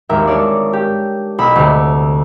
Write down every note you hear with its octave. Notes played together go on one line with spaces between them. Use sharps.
G#1 D#2 A#4 E5
D4 C#5 D5
G4
B1 B5 E6
D2 C3